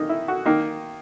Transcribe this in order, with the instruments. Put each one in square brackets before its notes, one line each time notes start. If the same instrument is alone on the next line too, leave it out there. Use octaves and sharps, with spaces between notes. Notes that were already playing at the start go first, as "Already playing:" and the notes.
Already playing: [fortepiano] D#3 A#3 D#4
E4
F#4
D#3 A#3 D#4